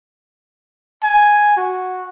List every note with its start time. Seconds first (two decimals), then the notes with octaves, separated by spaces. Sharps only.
1.03 G#5
1.57 F#4